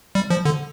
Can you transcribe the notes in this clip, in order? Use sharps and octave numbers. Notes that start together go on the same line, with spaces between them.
G3
F3
D3